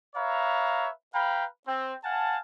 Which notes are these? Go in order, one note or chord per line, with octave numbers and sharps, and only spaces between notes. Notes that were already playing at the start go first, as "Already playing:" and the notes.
B4 C#5 E5 F5 A#5
B4 F5 G5 A#5 B5
C4
F5 F#5 G#5 A5